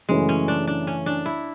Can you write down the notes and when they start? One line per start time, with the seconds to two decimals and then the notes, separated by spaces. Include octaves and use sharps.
0.09 F#2 C#3 E3 G#3 A3
0.29 C#4
0.48 D4
0.67 D4
0.87 C#4
1.06 D4
1.26 E4